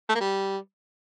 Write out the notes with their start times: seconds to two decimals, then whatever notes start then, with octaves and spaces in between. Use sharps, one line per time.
0.09 A3
0.15 A#3
0.21 G3